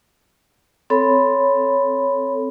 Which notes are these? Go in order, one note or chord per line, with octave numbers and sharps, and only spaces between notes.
C4 A4 C#5 B5